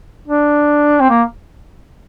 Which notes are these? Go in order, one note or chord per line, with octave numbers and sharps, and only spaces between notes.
D4
C4
A#3